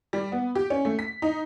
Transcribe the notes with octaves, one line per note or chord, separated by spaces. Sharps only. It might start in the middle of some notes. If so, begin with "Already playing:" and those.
G3
B3
G4
C#4
A3
B6
D#4